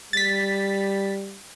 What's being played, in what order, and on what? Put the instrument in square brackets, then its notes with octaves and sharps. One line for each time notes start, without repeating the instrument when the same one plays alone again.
[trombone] G3 [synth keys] A6 B6